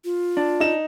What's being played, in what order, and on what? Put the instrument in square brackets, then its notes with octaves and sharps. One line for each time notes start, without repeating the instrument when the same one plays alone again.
[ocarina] F4
[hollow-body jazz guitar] D4
[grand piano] D#4 E7